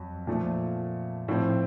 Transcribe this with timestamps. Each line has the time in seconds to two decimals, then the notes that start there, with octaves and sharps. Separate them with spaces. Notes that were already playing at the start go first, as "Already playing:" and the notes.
Already playing: F2 F#3
0.27 A#2 F3 A3
1.28 A2 F3 C4